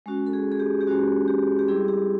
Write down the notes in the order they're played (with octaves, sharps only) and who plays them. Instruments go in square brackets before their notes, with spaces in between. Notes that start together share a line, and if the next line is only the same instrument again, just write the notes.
[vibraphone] G#3 C#4 F#4
A4
G#4
G#4
G4
G4
G#3 C#4 F#4
G4
G4
G3 C4 E4 G#4
G4